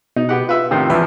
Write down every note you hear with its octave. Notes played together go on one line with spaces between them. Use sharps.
B2 D#4
B3 G4 F#5
F4 B4 E5
A2 C3 D#3
E2 F3 B4 E5